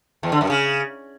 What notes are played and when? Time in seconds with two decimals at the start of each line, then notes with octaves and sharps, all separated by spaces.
0.23 E2
0.32 D3
0.41 F#2
0.50 C#3